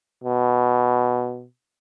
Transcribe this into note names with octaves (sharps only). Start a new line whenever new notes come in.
B2